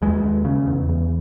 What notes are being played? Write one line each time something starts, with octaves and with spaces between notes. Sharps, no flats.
D#2 G#3
D#2
C#3
E2
E2